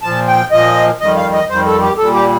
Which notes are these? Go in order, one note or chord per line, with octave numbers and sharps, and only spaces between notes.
A#2 F3 A5
G5
A#2 F3 D#5
F2 D#3 G3 D#5
F5
D#5
F2 D#3 G3 C5
A4
G4
A#2 G3 A4
G4